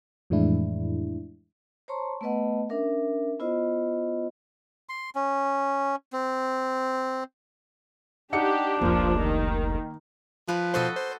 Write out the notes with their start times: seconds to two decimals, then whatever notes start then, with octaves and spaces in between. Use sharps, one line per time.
0.30 F2 A2 E3 G#3 D4 E4
1.88 C5 C#5 A5 A#5 C6 C#6
2.21 A3 B3 B4 D#5 F#5
2.70 C#4 D4 A#4 E5
3.40 B3 E4 F4 C5 D#5
4.89 C6
5.15 C#4
6.13 C4
8.33 D4 D#4 G4 F#5 C#7
8.81 F1 C#2 F3 A#3
9.19 D#3
10.48 F3 B4
10.74 B2 F#4 A4 C5 D#5
10.96 C5